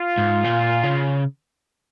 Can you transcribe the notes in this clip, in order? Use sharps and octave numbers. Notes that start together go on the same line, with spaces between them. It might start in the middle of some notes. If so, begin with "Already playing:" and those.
Already playing: F4
G#2
A#2
C#3